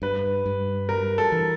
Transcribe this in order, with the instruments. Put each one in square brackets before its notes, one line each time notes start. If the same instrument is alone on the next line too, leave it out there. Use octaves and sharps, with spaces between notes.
[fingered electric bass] G2 [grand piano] B4
[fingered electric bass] G2
[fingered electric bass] G3 [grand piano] A#4
[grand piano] A4
[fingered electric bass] E3